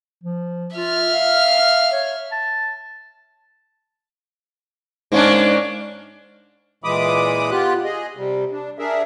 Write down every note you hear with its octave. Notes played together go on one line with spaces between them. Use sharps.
F3
F4 E5 F6
F5
C#5
A5
G#2 A#3 C#4 D4
A#2 E3 G#3 B5 D6 D#6
B3 F4 G4 F#6
G#4 D#5
C3 G3
D4
D4 G#4 A#4 E5